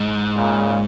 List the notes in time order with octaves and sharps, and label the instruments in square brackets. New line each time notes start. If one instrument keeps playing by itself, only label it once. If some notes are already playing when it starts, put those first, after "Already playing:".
Already playing: [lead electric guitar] G#2
[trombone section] A#2 C#3